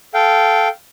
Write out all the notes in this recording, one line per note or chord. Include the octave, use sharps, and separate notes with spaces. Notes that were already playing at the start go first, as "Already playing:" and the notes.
A4 F5 G5